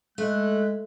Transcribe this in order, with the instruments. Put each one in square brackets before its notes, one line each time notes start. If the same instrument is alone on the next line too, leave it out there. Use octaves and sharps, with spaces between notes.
[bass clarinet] G#3 [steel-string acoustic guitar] A3 [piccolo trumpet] F#6